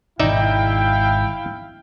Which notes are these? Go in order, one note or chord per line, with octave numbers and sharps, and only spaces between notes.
G#1 B2 D#4 E4 D5 E5 F5 G5